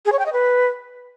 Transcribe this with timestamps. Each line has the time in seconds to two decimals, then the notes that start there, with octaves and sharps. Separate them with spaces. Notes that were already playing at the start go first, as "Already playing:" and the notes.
0.06 G#4
0.12 C#5
0.19 G5
0.26 D#5
0.33 B4